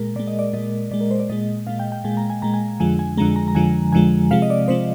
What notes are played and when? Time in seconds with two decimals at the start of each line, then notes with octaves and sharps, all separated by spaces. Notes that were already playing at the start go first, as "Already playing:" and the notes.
Already playing: A#2 G#3 A#4
0.15 A#2 G#3 D5
0.28 D#5
0.39 D5
0.53 A#2 G#3 D#5
0.91 A#2 G#3 D5
1.01 A#4
1.11 C5
1.20 D5
1.29 A#2 G#3 D#5
1.67 A#2 G#3 F5
1.79 G5
1.92 G5
2.04 A#2 G#3 G#5
2.17 A#5
2.30 G#5
2.42 A#2 G#3 A#5
2.54 G#5
2.80 F2 D3 F3 G#3 G#5
2.99 G#5
3.17 F2 D3 F3 G#3 A#5
3.36 A#5
3.48 A#5
3.55 F2 D3 F3 G#3 G#5
3.92 F2 D3 F3 G#3 G#5
4.31 C3 F3 G#3 F5
4.42 D#5
4.50 D5
4.68 C3 F3 G#3 C5